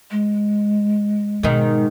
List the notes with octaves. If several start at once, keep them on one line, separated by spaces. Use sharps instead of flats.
G#3
G#2 B2 D#3